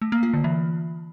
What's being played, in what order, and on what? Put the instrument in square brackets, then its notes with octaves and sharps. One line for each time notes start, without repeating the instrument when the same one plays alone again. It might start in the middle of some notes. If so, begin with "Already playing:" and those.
[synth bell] A3
A#3
F4
D3
E3